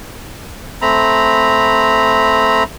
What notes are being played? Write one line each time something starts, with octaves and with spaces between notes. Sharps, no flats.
A3 C4 A#5 B5